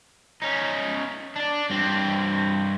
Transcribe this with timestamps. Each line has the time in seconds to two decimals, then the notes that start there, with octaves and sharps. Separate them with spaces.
0.42 C#4 D#4
1.36 D4 D5
1.70 G2 C4